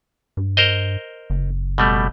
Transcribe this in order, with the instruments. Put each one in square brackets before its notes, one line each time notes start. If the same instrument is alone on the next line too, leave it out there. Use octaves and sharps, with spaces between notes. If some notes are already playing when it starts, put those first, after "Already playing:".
[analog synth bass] G2
[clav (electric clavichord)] A#4 C5 D#5
[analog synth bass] F#1
[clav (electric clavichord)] B2 G3 A3